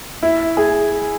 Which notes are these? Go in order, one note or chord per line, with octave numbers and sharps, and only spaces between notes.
E4
G#4